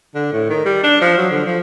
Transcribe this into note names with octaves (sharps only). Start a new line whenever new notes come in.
D3
A2
D#3
G3
D4
F3
F#3
D3
F3